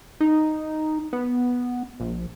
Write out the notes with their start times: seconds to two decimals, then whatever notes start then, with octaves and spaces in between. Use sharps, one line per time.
0.20 D#4
1.13 B3
2.00 A#1